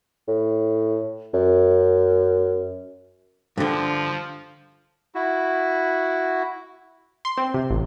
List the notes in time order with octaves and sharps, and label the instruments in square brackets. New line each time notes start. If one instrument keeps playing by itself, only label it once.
[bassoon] A2
F#2
[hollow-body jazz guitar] G2 D3 [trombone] F3
[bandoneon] E4 F#4
[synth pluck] C6
C4
C3
A1